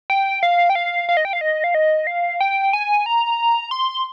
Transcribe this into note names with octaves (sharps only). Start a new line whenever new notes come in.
G5
F5
G5
F5
F5
D#5
G5
F5
D#5
F5
D#5
F5
G5
G#5
A#5
C6